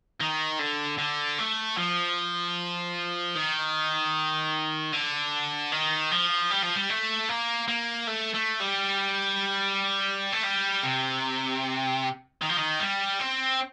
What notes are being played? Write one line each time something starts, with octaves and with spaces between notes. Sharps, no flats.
D#3
D3
D3
A3
F3
D#3
D3
D#3
F3
G3
F3
G3
A3
A#3
A#3
A3
A3
G3
A3
G3
C3
D#3
F3
D#3
G3
C4